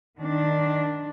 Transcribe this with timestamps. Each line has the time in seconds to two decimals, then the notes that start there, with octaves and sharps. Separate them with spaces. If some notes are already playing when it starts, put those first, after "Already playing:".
0.18 D#3 D4